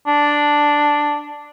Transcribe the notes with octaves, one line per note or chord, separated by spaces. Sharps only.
D4